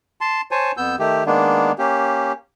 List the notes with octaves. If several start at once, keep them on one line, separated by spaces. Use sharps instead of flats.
A5 C6
C5 C#5 G#5 A5
F2 B3 E6 G6
D#3 A3 G4
D#3 G#3 A#3 B3 D4
A#3 C#4 G4